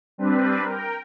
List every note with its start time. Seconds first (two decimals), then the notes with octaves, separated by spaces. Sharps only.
0.18 G3 C4 D4 B4
0.62 A#4 G5